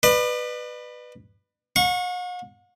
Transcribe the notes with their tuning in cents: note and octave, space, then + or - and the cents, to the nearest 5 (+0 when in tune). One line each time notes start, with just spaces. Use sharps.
B4 +0 D5 +45
F#5 -45 C#6 -20